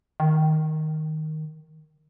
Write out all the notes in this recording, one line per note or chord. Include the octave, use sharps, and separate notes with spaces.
D#3